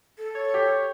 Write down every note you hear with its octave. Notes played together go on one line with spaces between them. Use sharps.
A4
C#5
G4